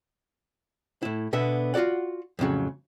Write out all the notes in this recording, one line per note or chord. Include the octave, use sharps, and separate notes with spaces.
A2 E4
B2 D3 B3 E5
F4 F#4 A4 D5 F#5
F2 A2 C#3 F#3